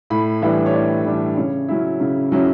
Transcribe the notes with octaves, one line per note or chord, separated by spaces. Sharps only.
A2 B5
E3 G3 D4 E5
C#5
A2 D5
E3 G3 D4 D5
C#3 C#5
F#3 C#4 E4
C#3
F#3 C#4 E4